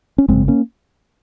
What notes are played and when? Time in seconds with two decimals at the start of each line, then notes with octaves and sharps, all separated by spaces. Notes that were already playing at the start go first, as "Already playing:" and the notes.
0.18 C#4
0.28 G#1 F#2 C#3 G#3 C4
0.48 A#3 C#4